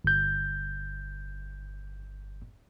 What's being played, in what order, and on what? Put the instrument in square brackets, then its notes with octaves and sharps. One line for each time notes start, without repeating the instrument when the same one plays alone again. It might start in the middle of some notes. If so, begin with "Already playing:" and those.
[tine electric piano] G1 G6